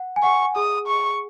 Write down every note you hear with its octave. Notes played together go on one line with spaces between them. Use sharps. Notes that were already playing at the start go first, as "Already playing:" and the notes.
Already playing: F#5
G#5
F#5 C#6
G#4 D#6
C#6